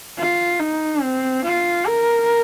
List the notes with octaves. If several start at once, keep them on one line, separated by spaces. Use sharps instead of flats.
F4
D#4
C4
F4
A#4